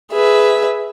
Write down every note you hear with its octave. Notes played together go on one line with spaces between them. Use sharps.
G#4 B4 E5